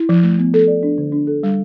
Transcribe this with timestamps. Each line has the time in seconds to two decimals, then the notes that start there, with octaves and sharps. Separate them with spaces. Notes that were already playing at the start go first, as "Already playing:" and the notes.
Already playing: E4
0.09 F3
0.23 A3
0.39 B3
0.54 A4
0.68 D5
0.83 D4
0.98 D3
1.12 D4
1.27 A4
1.43 G3